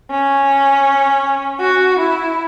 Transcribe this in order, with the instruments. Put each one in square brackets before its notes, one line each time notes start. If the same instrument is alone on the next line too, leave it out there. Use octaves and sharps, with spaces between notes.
[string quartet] C#4
F#4
E4